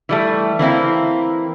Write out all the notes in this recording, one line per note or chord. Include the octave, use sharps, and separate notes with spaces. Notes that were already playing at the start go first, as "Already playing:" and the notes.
E3 G3 A3
E3 A#3 C4 E4